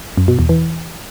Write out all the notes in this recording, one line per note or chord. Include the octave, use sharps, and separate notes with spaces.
F#2
B2
E2
E3